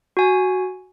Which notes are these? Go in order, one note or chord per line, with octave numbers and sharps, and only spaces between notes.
F#4 G#5